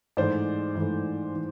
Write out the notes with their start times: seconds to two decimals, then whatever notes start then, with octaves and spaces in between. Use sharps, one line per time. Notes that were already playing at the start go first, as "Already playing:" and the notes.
0.17 G#2 E3 A3 C5 D5
0.75 G#2 E3 A3
1.35 E3